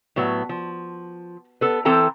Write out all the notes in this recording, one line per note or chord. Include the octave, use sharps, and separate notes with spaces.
A2 F#3 B3
F3
B3 A4 B4
E3 C4 A4 G5 A#5